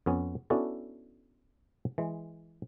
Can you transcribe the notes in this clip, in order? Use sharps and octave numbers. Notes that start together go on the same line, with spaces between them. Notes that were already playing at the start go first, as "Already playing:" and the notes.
F2 B3 C#4
B3 C#4 D4 E4 F#4 A4
E3 G#3